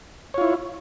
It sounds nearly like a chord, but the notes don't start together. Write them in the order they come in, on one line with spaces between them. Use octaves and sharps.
C#5 F4 E4